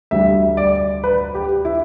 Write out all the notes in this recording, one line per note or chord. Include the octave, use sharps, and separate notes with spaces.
D2 D3 G3 E5
D5
B4
G4
E4